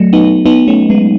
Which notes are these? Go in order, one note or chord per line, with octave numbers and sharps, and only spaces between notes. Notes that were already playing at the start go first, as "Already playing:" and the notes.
Already playing: F#3 A3
B3 D#4
B3 D#4
A3 C#4
G#3 B3